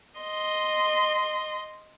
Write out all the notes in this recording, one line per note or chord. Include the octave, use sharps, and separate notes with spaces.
D#5 C6